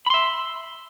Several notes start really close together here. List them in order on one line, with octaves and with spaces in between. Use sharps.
B5 C6 E5